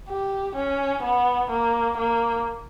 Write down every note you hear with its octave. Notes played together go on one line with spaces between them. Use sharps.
G4
C#4
B3
A#3
A#3